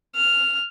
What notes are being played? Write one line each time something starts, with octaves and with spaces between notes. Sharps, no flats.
F6